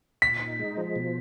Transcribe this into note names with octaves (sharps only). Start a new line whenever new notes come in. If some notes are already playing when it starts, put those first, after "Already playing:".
A#2 B6
D#4
G#3
F3
B2